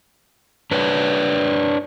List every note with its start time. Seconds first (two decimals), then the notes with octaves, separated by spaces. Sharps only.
0.71 D4 B4 C#5